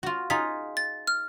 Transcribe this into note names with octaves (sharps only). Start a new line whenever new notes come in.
F4 F#4
D#4 F4 G#4 B6
A6
F6